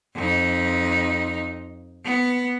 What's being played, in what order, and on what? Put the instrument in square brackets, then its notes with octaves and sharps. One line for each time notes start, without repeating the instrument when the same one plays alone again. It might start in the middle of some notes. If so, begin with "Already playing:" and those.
[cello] F2 D#4
B3